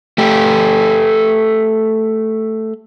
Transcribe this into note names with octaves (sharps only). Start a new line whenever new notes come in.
A3 G4